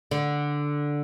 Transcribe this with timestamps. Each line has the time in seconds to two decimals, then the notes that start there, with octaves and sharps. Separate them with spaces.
0.11 D3